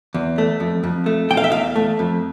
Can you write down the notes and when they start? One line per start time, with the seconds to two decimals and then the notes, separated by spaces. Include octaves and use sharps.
0.15 E2
0.38 A3
0.60 F2
0.84 F2
1.06 A3
1.30 E2 G5
1.37 F5
1.44 E5
1.52 E2 F5
1.76 A3
1.99 F2